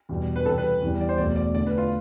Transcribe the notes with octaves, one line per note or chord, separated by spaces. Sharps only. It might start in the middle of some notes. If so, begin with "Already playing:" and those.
E2 B2 G3
B4
E2 C3 G3 A4
B4
E2 C3 E3 G3
D5
C5
E1 E2 B2 A3 D5
D5
D2 D3 A3 D5
B4
F4